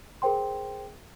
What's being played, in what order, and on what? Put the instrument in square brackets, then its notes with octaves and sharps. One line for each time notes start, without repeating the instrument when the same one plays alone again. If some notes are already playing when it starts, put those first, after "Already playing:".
[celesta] G#4 A#4 C5 G5 C6